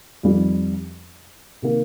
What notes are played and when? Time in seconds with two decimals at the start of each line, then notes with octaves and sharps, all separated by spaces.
0.23 F2 D#3 G3 C4 F4
1.62 C3 D#3 A#3